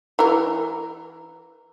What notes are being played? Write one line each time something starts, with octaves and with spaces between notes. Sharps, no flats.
E3 A#4